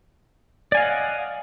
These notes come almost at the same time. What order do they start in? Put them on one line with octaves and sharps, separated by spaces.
D5 G#5 F5 D#5 F#5